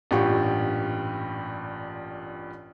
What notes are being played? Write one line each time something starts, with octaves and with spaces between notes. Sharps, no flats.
A1 G2 A#2 F4 G4 C#6